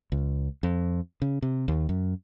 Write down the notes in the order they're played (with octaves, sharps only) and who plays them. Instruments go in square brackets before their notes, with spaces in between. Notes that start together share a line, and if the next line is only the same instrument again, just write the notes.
[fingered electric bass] C#2
F2
C#3
C3
D#2
F#2